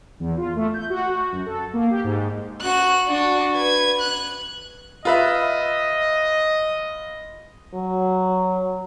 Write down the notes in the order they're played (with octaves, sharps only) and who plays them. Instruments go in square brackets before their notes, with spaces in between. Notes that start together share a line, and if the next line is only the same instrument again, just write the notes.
[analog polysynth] E2
F4
A3
G6
F#4
F#2
A4
A#3
G4
G#2
[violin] F#4 F#6
D4 F#4
B4 G#6
F#6
[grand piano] F4 B4 E5 [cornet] D#5
[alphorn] F#3